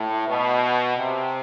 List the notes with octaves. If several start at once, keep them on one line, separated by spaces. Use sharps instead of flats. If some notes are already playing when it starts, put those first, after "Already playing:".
Already playing: A2
B2
C3